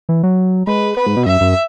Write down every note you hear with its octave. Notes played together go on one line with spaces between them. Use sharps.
E3
F#3
G#3 B4
B3 B4
G#2
B2
F#2 E5
F#2